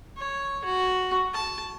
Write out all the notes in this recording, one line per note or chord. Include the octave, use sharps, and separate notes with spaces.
C#5
F#4
A5